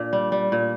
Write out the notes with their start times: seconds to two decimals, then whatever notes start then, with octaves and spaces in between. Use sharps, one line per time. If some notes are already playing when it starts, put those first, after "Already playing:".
Already playing: A#2 D4
0.13 G3
0.32 G3
0.52 A#2